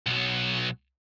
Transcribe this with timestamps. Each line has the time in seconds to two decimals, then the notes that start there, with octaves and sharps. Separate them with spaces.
0.07 B1 F#3